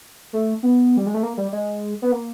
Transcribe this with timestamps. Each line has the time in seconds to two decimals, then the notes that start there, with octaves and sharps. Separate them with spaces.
0.33 A3
0.63 B3
0.97 G3
1.06 G#3
1.14 A3
1.23 A#3
1.37 G3
1.52 G#3
2.02 B3
2.12 A#3